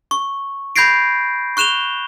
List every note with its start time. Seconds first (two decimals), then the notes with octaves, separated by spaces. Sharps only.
0.11 C#6
0.76 B5 G6 G#6 A#6 C7 D7
1.57 C#6 F#6 E7 F7 G7